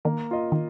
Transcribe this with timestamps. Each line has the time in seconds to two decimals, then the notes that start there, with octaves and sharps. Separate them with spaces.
0.05 D#3 A#3
0.31 F4 A#4 D#5
0.52 D#3